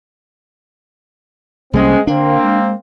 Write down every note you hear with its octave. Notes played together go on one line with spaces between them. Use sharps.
C2 G3 G#3 A#3 C4 C#4
D3 A#3 C4 D4
G#3